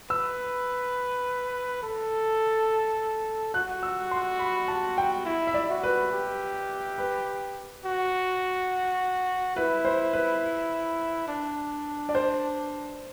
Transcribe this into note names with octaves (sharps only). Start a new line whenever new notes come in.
B4 E6
A4
F#4 F#6
E6
C6
B5
A5
G5
E4
E5
D5
F#4
B4
G4
B4
F#4
E4 B4
C5
B4
D4
D5
C5